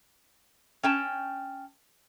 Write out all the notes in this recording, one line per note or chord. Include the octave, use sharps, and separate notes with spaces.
C#4 G5 A5